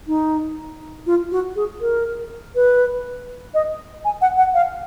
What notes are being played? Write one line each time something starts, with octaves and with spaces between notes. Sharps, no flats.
D#4
F4
F#4
G#4
A#4
B4
D#5
G#5
F#5
F#5
F5